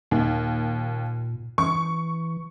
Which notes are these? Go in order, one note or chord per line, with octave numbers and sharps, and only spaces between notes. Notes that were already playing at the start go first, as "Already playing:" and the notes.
D#2 A#2
E3 C#6